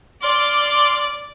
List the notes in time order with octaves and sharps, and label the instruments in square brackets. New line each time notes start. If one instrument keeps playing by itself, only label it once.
[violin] D5 [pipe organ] C6 D6 F6